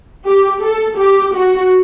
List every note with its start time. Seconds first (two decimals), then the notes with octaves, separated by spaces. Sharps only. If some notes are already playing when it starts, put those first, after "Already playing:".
0.25 G4
0.62 A4
0.98 G4
1.35 F#4